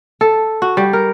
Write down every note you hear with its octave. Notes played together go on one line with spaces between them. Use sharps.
A4
F#4
G3
A#4